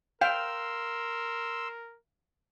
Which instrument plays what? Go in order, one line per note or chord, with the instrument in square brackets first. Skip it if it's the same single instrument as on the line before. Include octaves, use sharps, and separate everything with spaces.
[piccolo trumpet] A#4 [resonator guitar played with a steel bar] F5 [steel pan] G5 [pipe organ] C6 E6